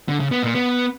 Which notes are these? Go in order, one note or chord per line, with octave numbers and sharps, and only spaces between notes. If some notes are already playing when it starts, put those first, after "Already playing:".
D3
C#3
B3
A#2
B3